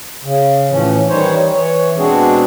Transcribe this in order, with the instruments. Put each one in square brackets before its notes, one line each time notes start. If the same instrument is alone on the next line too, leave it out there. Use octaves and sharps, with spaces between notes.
[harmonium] C#3
A2 E3 F3 C#4
D#3 E3 G3 D#4 C5 C#5
E3 C#5
B2 G#3 C4 D4 F#4 G#4